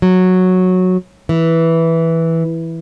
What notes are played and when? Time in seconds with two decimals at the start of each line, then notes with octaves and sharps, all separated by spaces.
0.02 F#3
1.29 E3